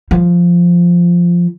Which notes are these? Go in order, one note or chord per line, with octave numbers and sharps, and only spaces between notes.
F3